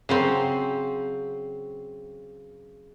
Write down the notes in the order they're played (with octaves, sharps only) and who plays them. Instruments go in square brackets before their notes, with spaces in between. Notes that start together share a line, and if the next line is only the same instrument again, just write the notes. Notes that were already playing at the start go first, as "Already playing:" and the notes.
[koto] C#3 F#3 C4